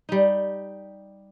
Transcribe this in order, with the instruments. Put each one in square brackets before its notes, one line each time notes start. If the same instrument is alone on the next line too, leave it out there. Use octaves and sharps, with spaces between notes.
[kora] G3 D#4